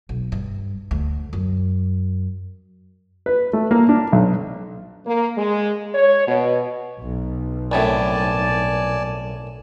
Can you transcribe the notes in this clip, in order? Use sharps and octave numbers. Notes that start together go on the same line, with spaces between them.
B1
G2
D2
F#2
B4
A3
A#3
D4
B1
A#3
G#3
C#5
B2
B1
C2 F#2 A2 D5 G#5 A5